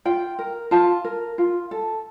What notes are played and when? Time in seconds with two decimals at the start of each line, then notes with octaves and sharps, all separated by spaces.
0.05 F4 G5
0.39 A#4
0.71 F4 A5
1.04 A#4
1.38 F4
1.71 A4